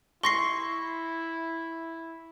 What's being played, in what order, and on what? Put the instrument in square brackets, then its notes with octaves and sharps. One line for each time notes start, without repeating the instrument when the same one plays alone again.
[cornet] E4 [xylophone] C6 A#6 C7 [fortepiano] C#6